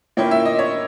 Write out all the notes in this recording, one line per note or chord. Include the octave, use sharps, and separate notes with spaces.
A#2 A#3 C#4 E4 G5
E5
D#5
C#5